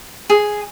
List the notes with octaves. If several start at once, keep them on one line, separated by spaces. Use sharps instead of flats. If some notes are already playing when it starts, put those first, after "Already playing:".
G#4